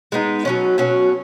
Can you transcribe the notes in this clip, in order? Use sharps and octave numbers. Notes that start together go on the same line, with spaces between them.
G#3 B3 D#4
B2 F#3 C#4
B2 F#3 C#4